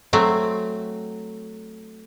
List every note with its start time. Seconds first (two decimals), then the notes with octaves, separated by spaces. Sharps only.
0.13 F#3 A3 C4